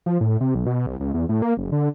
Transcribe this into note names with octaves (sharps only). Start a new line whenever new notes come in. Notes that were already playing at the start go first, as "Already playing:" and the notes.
F3
A2
C3
B1
B2
C2
C#2
E2
A2
A#3
F#1
D3